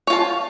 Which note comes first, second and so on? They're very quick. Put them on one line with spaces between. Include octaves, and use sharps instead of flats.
C#5 F4 A5